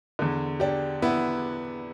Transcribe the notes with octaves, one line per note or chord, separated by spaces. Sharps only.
E2 D3
D4 G4
B3 E4